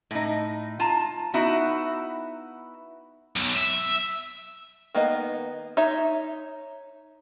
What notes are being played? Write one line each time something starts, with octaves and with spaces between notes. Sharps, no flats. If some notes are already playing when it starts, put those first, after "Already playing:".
A2 D#4
F4 A5 A#5
B3 D#4 E4 F#4
B1
E5
D#3 A#3 B3 D#5
D#4 C#5 E5